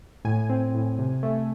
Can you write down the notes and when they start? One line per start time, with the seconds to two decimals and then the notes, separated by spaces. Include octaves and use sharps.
0.25 A2 G#5
0.50 C4
0.74 A2
0.99 C3
1.23 A3